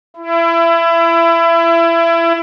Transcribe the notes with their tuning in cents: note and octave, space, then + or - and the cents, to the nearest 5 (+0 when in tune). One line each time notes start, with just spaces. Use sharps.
E4 +25